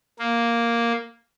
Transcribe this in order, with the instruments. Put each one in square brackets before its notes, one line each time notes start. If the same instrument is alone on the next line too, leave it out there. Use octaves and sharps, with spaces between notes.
[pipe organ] A#3